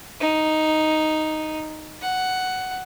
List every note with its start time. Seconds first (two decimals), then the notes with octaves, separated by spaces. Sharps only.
0.20 D#4
2.02 F#5